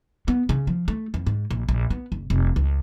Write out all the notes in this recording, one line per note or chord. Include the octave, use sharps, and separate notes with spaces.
B3
C#3
F3
A3
F2
G#2
A#1
A#1
B3
F#1
F1
C#2